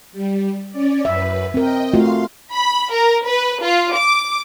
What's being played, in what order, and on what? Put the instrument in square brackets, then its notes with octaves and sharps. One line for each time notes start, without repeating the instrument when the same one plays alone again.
[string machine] G3
C#4 D5
[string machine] F#2 B4 [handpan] E5
[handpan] C4 A#4 [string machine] D#5 G5
[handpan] A3 F4 F#4 [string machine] F5 C6
[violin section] B5
A#4
B4
F4
D6